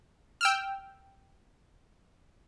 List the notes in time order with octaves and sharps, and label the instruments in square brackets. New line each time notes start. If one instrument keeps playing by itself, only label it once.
[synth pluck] G5 E6 F6